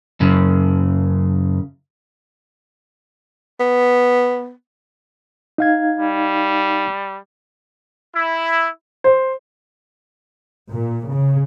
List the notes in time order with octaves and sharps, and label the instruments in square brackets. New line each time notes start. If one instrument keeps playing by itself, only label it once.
[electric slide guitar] F#2 C#3
[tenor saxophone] B3
[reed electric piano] D#4 F5 G#6
[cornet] G3
[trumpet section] E4
[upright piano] C5
[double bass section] A#2
C#3